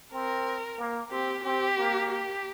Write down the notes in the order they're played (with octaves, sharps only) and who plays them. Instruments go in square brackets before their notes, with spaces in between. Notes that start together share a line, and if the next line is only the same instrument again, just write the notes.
[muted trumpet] C4 [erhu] A#4
[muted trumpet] A#3
[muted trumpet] C4 [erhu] G4
[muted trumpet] C4 [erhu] G4
[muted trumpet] A#3
[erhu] G4